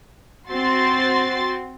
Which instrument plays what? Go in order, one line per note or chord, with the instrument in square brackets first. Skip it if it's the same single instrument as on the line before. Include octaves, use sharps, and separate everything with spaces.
[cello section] C4 F#4 [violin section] C6 A6